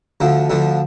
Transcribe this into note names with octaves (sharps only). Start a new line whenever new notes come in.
D2 D3 F3
D2 D3 F3